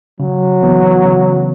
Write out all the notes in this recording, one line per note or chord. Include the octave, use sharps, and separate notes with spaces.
C#3 F#3
E3 B3
C#3